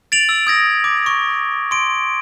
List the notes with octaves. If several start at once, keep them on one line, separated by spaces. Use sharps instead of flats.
A6 D7 F7 F#7
E6
D#6 G#6 A#6
D6
C#6
C6 D7